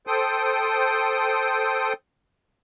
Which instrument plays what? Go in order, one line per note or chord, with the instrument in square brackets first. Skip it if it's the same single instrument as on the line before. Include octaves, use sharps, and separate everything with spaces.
[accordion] A4 C5 G5 D#6